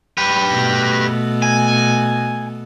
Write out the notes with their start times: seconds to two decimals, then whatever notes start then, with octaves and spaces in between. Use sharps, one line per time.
0.18 G4 B4
0.51 B2 A3
1.42 G#5